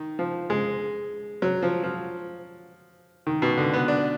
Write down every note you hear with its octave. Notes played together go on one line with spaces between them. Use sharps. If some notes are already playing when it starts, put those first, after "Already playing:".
Already playing: D#3
F3
G#3
F#3
F3
F3
D#3
B2
D3
B3
D4